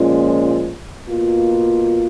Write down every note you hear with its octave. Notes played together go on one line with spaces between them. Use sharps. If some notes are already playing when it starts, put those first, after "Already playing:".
Already playing: A#2 F3 G#3 C#4 F4
B2 A#3 F4